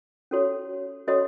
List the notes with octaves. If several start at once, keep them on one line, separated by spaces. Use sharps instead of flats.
C#4 F#4 A4 C#5
C#4 F#4 A4 C#5 D#5